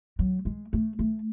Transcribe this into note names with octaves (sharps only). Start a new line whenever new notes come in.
F#3
G#3
A3
A3